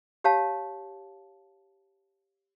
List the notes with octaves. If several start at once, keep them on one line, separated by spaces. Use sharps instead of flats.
G4 C#5 F5 A5